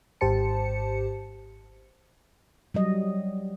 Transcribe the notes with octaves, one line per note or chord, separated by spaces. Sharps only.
G#1 G#2 G4 C5 A5 C#7
F#3 G3 D#5